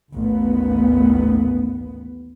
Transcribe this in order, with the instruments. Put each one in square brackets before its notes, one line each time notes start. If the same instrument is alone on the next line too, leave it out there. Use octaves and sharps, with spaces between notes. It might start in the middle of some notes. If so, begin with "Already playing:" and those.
[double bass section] A1 D#2 B3